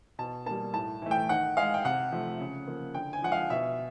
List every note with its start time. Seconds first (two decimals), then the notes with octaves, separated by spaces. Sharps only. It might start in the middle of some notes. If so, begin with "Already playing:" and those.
0.19 B2 A5
0.46 G3 A#3 A5
0.74 A2 A5
1.02 E3 A3
1.11 G5
1.29 D#3 F#5
1.57 G#3 F5
1.74 G5
1.85 C3 F#5
2.12 F3 A3
2.40 C#3
2.67 F3 A#3
2.95 D3 G5
3.13 G#5
3.22 F3 G#3 F#5
3.32 F5
3.50 B2 E5